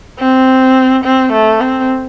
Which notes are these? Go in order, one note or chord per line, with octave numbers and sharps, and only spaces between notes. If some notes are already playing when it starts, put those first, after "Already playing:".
C4
C4
A3
C4